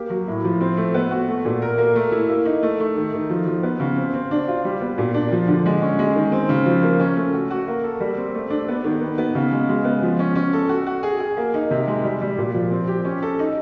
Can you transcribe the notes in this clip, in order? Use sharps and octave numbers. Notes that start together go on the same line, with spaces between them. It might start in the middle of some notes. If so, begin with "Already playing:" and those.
Already playing: A#3 G4
F#3
A2
F3
C4
A3
B3
F#4
A3
A#2
A#4
A#3
A3
E4
A#3
D#4
A3
A3
D#3
D#3
F3
F3
B3
C#3
C4
C4
D4
F4
G3
B3
A#2
D4
F3
D3
G#3
C#4
G#3
D#3
C4
C#3
F3
A#3
C#4
A3
F#4
F#4
A#3
A4
G3
C4
A3
D4
B3
D#3
B3
B3
C#3
G#3
G#3
B3
F3
C#4
C#4
A4
F#4
F#4
G#4
G#4
A#3
D#4
C3
G#3
G3
G3
A#2
F3
C4
G4
C#4
A4
D#4